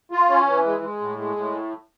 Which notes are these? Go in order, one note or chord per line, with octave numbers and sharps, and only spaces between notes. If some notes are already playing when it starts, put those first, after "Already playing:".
F4
C#4
E3
G#3
G#3
A2
G#3
A2